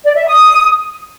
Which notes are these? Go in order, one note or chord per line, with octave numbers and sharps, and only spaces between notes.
D5
E5
D#6